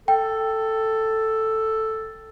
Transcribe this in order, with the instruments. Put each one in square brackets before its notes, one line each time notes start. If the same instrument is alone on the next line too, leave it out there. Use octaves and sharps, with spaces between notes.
[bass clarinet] A4 [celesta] G5